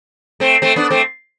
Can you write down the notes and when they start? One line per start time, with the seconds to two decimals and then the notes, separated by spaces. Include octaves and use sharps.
0.40 A3 C4
0.62 A3 C4
0.76 B3 D4
0.90 A3 C4